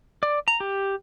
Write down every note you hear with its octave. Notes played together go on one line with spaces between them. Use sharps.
D5
A#5
G4